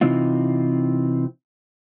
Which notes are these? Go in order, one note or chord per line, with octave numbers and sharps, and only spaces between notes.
C3 E3 C4 D#4 F4